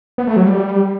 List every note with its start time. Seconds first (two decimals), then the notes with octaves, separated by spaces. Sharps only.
0.18 B3
0.27 A3
0.36 F#3
0.46 G3